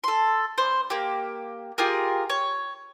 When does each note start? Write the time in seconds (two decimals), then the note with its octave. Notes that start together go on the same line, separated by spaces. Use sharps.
0.04 A4 C6
0.58 C5
0.90 A#3 G4
1.78 F4 G4 G#4 A#4
2.30 C#5